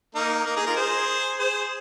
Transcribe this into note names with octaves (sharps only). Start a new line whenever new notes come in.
A#3 D#4
A#3 D#4
D#4 G#4
F4 A#4
G#4 C5
G#4 C5